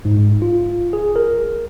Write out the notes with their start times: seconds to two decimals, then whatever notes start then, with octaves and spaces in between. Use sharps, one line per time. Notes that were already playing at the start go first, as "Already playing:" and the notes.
0.05 G#2
0.42 F4
0.93 G#4
1.16 A#4